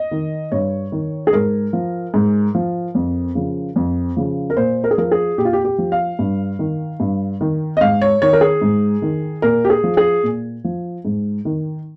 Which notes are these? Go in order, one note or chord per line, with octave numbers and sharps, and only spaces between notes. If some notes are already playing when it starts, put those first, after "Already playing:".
Already playing: D#5
D#3
G2 C#5
D#3
G#4
G#2 A#4
F3
G#2
F3
F2
C#3 F3
F2
C#3 F3
A#4
A#2 C5
A#4
G#4
F3 A#4
G#4
A#2 G4
F4
G4
G4
F3
F5
G2
D#3
G2
D#3
D#5
G#2 F5
C#5
D#3 C#5
A#4
G#4
G#2
D#3
A#2 A#4
G4
G#4
F3
G#4
A#2
F3
G#2
D#3